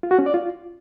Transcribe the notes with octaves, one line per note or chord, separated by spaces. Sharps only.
F4
F#4
C#4
D5
F4